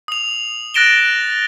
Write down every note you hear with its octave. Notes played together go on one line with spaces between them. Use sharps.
D#6 F7
F#6 A6 A#6 D7 E7 G7